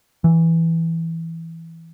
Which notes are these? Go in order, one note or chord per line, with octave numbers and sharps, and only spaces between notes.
E3